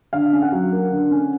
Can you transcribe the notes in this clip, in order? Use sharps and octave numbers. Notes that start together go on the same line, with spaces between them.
D3 F5
C#4
F#5
F#3
A#3
D3
C#4